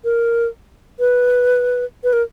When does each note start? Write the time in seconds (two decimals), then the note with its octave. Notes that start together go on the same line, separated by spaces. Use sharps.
0.04 A#4
0.99 B4
2.03 B4
2.13 A#4